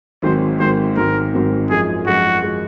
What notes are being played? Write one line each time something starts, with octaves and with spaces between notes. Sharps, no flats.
G#1 G#2 F#3 C4 C5
G#1 G#2 F#3 C4 C5
G#1 G#2 F#3 C4 A#4
G#1 G#2 F#3 C4
F#2 F3 G#3 G#4
F#2 F3 G#3 F#4
F3 G#3